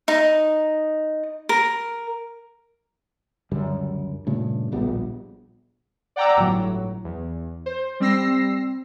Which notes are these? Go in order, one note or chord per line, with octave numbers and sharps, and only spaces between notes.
D#4
A#4
C#2 F#2 D3 G3
G2 A#2 C#3 A3
D1 A#1 G3 B3
D5 F#5 G5 A#5 D6 E6
G1 A2 F#3
E2
C5
G3 C4 E6 A#6 C7